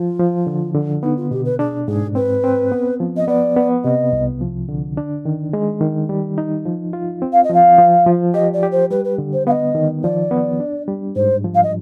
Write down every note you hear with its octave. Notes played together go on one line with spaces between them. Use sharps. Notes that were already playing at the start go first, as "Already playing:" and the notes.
Already playing: F3 F4
F3
D3
D3
B3 D#4
F4
B2 G4
B4
D4 G#4
G#2 G#4
C4 B4
C4
B3
F3
D#5
B3 D5
B3
C3 D#5
C2
F3
D3
D4
D#3
G#3
D#3
G3
D#4
F3
F4
C4
F5
D#5
F3 F5
F3
F3
G4 D#5
D5
G4
C5
G3 B4
B4
D3
C5
B3 D#5 F5
D#3
F3 D5
B3
D4
G3
G#2 C5
F3
F5
D#5